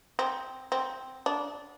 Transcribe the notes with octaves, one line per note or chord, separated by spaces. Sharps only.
C4
C4
D4